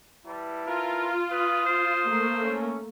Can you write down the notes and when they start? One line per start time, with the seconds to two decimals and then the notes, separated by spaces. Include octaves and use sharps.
0.26 G3 E4 B4 A5
0.67 F4 A#4
1.31 B4 D#6
1.65 C5
2.07 A3 A#3
2.44 C#4